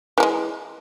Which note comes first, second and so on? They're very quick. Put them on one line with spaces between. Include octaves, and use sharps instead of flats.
E3 A#3 G#3